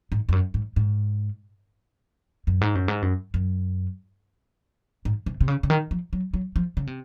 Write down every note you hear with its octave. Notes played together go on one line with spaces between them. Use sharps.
G#2
F2
F#2
G#2
G#2
F#2
G#2
F#2
G#2
F#2
F#2
G#2
C3
C3
C#3
C#3
D#3
F3
F#3
F#3
F3
C#3
C3